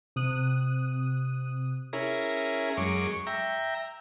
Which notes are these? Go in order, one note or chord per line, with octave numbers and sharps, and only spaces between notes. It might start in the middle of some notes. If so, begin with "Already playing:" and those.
C3 D#6 F#6 D#7
C#4 E4 G#4 A#4
F#2 G#3 C#6 D6
E5 G5 A#5